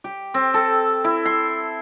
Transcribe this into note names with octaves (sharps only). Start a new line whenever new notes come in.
G4
C4
A4
E4
C6